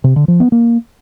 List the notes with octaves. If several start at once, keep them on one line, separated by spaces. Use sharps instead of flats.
C3
D3
F3
B3
A#3